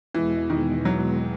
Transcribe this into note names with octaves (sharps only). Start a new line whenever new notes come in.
E2 B2 E3 G#3
D#3
F#3